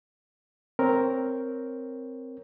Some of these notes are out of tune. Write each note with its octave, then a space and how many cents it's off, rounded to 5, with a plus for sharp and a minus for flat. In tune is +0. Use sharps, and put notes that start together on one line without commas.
C4 +0 A#4 +0 C#5 +0